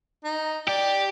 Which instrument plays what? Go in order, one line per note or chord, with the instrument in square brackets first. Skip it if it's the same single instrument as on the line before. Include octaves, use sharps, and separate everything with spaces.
[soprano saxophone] D#4
[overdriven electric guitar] G4 [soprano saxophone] D5